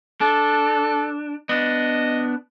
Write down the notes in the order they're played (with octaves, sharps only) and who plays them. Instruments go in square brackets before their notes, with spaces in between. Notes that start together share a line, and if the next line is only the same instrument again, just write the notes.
[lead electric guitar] D4 [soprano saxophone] A4
[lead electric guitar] B3 D4 [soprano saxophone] D#5